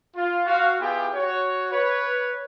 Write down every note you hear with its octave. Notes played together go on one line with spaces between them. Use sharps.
F4
F#4 F5
B3 E4 F4 G4 G#4 G5
F#4 C#5
B4 C#5